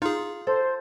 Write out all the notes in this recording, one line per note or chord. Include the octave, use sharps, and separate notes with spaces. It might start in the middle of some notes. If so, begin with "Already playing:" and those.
D#4 F4 G#4
A4 C5